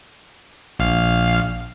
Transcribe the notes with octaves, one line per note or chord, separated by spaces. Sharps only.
A#1 F5